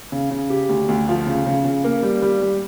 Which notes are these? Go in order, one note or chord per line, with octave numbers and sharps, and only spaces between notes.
C#3
C#3
G4
D2
D2
F3
C#3
C#3
C#3
A#3
G3
G3
G3